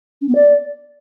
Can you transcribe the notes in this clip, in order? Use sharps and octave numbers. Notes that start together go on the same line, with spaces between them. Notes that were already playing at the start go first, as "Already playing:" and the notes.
C#4
B3
D5